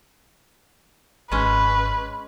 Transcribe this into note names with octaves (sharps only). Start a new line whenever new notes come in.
G#1 G#3 C#4 B4